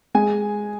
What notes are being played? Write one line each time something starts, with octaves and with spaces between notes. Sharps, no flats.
G#3 G#5